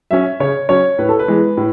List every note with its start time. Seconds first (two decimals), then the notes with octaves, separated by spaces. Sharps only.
0.11 F#3 C#4 E5
0.40 C#3 C#5
0.69 F#3 C#4 C#5
0.98 A2 B4
1.09 A4
1.19 B4
1.28 E3 G#3 B3
1.57 A2